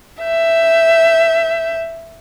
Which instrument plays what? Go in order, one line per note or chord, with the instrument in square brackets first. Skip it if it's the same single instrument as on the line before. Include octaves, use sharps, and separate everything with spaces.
[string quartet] E5 G6